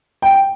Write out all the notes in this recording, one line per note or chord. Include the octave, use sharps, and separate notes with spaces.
G5